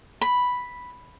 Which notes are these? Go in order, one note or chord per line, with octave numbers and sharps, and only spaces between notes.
B5